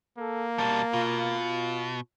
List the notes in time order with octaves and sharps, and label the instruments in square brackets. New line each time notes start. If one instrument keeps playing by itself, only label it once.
[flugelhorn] A#3 [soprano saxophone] A4
[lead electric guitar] B2 G3 [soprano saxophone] A5
[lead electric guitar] B2 [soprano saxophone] F4